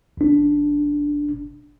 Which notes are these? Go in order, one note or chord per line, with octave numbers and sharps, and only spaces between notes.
G1 D4